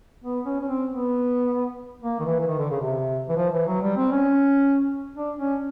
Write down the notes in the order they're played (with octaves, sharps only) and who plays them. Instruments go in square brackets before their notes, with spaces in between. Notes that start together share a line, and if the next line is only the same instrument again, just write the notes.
[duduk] B3
C#4
C#4
C4
B3
A#3
D#3
E3
E3
D#3
D3
C#3
C3
E3
F3
E3
F#3
G3
C4
C#4
D4
C#4